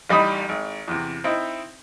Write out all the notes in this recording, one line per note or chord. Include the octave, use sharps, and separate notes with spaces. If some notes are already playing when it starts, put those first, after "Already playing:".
A1 G3 D#4 B5 D#6
G#1
E2 C3
C4 D#4 E4